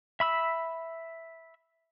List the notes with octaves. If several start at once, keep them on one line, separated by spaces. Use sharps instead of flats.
E5 B5 E6